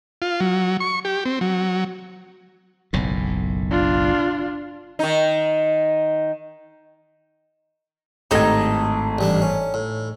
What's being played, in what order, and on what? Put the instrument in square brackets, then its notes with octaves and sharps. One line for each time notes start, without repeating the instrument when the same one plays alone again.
[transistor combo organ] F4
F#3
C#6
G4
C4
F#3
[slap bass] F#1 B1 A2
[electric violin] D4 F4
[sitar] D#3 D#4
[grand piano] G#1 A2 G#6 [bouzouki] D#4 A4 D#5 [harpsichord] G4
[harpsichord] A1 G3 D4
C#4
A2